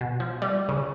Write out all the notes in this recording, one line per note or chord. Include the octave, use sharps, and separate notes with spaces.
B2
F3
G3
C#3